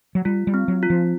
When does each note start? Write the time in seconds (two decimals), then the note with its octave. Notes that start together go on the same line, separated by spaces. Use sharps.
0.15 F#3
0.25 G3 F4
0.47 G3
0.54 C4
0.68 F#3
0.83 F4
0.90 F3